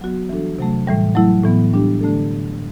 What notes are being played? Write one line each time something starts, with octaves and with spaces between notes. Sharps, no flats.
F#3 B3 F#4
E3 G3 D4 F#4 A4
C3 F#3 A3
A2 E3 G3
F#3 A3 E4
A2 E3 B3
G3 D4 G4
D3 A3 D4 A4